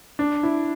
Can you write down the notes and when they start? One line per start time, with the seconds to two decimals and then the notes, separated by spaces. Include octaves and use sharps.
0.19 D4
0.43 E4